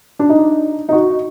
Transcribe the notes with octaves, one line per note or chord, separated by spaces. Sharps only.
D4
D#4
D#4
F#4